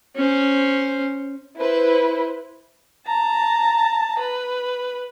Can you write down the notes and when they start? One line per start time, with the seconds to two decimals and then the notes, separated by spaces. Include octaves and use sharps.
0.16 C#4 C5
1.58 E4 B4 C5
3.06 A5 A#5
4.19 B4